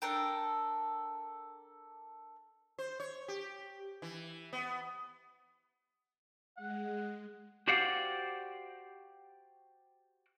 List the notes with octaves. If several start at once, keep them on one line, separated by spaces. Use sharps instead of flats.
D4 A4 A#4 G5
C5
C#5
G4
E3
B3
G#3 F#5
F#4 G4 C5 D5 F5 F#5